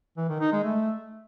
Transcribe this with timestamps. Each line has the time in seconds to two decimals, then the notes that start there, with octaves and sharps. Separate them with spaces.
0.17 E3
0.29 D#3
0.40 D#4
0.52 G#3
0.64 A3